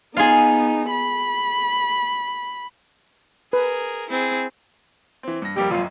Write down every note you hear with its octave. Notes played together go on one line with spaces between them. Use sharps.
B3 D#4 F4 G#4
B5
G#4 A#4 B4
C4 E4 G#4
E3 C4
G2 A#6
F2 G3 A#3 G4
A1 F#2 F4